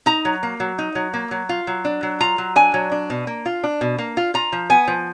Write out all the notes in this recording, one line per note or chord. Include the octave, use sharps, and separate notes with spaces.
D#4 A#5
F#3
A#3
F#3
D#4
F#3
A#3
F#3
F4
F#3
D4
F#3
F4 A#5
F#3
D4 G#5
F#3
D4
B2
A#3
F4
D4
B2
A#3
F4
F4 A#5
F3
B3 G#5
F3